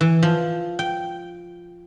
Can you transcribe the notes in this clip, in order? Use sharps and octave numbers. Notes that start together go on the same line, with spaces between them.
E3
F3
G5